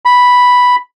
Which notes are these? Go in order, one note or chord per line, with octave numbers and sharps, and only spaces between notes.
B5